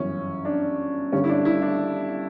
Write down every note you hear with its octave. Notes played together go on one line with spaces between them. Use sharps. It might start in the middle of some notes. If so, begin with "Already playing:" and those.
Already playing: G1 F#2 E3 C#4
D4
G1 G2 D3 C#4
E4
D4
E4
D4